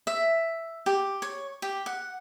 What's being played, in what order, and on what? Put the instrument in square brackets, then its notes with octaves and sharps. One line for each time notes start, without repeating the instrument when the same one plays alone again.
[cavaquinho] E5
G4
C#5
G4
F#5